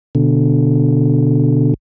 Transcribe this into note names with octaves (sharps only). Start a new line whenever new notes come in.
B2 D3